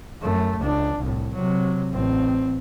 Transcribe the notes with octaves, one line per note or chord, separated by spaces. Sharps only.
F#2 A3
C#2 D4
C2 A2
C3 F#3
A1 C4